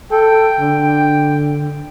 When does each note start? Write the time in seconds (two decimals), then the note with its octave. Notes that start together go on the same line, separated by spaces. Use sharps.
0.11 A4 G5
0.60 D3